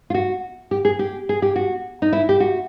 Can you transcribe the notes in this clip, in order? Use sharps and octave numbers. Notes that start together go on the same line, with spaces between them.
F4
F#4
G4
G#4
G4
G#4
G4
F#4
D#4
E4
G4
F#4